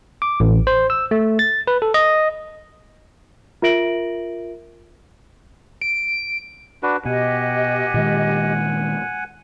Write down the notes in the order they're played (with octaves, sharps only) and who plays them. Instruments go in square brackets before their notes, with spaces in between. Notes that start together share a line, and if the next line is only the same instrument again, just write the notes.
[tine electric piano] D6
A1
C5
E6
A3
A6
B4
A4
D#5
[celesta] F4 A#4 E5 A#6 D7 F#7
[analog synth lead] D7
[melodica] D4 F#4 B4
[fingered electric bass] B2 [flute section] G4 D#5 [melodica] F#5 G#5
[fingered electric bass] A#2 D#3 G#3